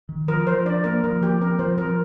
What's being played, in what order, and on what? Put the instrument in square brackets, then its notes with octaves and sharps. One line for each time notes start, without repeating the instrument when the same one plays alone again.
[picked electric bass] D#3
[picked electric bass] F3 [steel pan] A#4
[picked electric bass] F3 [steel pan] C5
[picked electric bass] D4 [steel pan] D5
[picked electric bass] A#3 [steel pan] A#4
[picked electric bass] F3 [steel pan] A#4
[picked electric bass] F3 [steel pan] G4
[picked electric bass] C4 [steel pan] A#4
[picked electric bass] F3 [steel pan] C5
[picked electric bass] F3 [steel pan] A#4